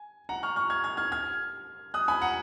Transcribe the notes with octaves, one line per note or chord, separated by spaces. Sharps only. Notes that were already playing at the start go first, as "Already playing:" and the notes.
Already playing: G#5
F#5 A#5
C#6 F6
C#6 F6
F6 G#6
F6 G#6
F6 G#6
F6 G#6
D#6 F#6
G#5 B5
F#5 A#5